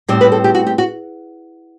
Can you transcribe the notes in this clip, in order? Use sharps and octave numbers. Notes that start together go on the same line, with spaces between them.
A2 G3 C4 D5
B4
A4
G4
F#4
G4
F#4